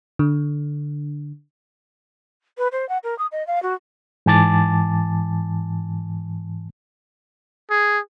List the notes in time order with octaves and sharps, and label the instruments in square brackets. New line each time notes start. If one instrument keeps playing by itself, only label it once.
[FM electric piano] D3
[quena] B4
C5
F#5
A#4
D#6
D#5
F5
F#4
[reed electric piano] G#2 E3 G#5 A5 D6 A6
[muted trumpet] G#4